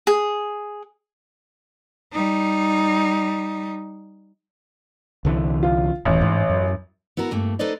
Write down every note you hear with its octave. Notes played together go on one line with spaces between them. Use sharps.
G#4
G3 D#4
C2 D3 E3
F4
D#1 A1
G#2
F#2
B3 E4 F#4 A#4
G2 A3 A#3
D#4 A4 B4 C5 D5 D#5